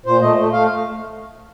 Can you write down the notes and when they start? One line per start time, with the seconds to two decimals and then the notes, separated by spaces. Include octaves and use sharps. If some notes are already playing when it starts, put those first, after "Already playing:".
0.06 A#2 C5
0.21 A3 D#5
0.37 A3
0.52 A3 F5